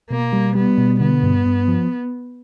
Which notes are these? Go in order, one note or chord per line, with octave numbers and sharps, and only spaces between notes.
B2 A#3
G3
G3 B3
B2
D3 B3
G2
G2
F3